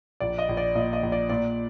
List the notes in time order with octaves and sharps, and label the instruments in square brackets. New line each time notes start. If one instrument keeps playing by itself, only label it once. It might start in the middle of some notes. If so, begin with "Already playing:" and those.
[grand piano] A#1 D5
D#5
A#1
D5
A#2 D#5
D#5
A#1
D5
A#2 D5